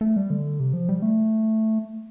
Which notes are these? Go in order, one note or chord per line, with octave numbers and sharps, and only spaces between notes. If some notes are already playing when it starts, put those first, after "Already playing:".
A3
G3
D3
C3
F3
G3
A3